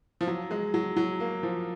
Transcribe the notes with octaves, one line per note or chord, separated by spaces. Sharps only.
F3
F#3
G#3
F#3
F#3
A#3
F3